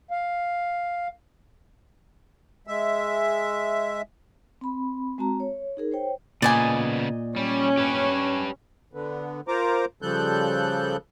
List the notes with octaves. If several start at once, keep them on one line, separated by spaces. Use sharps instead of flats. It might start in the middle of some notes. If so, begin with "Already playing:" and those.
F5
G#3 E5
C4 B5
G#3 C4 F#4 A5 A#5
C#5
D#4 G#4 A#4
C5 C#5 G5
A#2 C#3 B3 D5 D#5 G#5
G3 C#4
G4 B4
D3 B3
F4 A#4 C5 A#5 D6
C#3 F3 G3 A4 F#6 G6